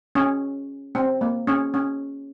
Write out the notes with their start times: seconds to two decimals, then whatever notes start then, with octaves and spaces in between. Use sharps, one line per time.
0.15 C#4
0.95 C4
1.21 A#3
1.47 C#4
1.74 C#4